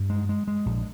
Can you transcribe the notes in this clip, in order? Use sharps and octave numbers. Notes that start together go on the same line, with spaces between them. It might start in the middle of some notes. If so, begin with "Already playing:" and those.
Already playing: G2
G#3
G#3
G#3
A#1